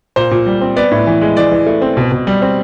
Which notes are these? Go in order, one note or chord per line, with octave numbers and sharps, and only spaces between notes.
A#2 C5
A#2
G3
C4
B3 D5
A2
E3
G#3
E3 D5
E3
A3
C4
B2
B2
G3
C4